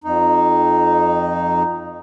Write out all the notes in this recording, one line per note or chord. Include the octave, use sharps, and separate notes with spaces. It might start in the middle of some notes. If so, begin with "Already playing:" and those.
F2 D#4